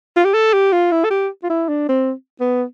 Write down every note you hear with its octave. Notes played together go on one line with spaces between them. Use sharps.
F4
G4
A4
G4
F4
E4
A4
G4
F4
E4
D4
C4
B3